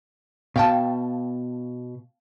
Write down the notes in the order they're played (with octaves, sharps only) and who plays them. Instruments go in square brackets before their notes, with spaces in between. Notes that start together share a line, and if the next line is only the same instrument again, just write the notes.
[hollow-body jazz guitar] B2 [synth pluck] F5 G5 A5